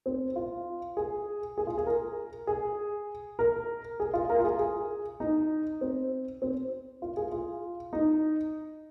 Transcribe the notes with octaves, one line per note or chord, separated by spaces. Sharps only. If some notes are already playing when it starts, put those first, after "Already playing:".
C4
F4
G#4
G#4
F4
G#4
A#4
G#4
A#4
G#4
F4
A#4
F4
G#4
G#4
D#4
C4
C4
F4
G#4
F4
D#4